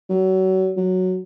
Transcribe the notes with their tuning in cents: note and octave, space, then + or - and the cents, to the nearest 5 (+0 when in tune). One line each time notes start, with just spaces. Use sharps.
F#3 +30
F#3 +0